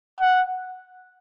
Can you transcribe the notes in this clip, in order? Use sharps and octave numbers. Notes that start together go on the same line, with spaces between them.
F#5